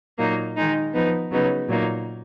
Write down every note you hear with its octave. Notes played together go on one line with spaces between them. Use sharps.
A#2 F#3 A#3 D#4
D#3 G#3 D#4
F3 B3 D#4
C#3 F#3 B3 D#4
A#2 F#3 A#3 D#4